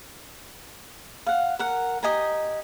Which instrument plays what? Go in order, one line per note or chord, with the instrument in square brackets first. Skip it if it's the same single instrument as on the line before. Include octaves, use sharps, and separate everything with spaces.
[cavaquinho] F5 F#5
A#4 F#5
G4 D#5 G#5 A#5